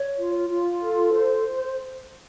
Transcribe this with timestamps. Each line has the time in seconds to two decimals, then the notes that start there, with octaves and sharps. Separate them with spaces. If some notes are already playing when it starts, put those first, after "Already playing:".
Already playing: C#5
0.18 F4
0.49 F4
0.81 A4
1.13 C5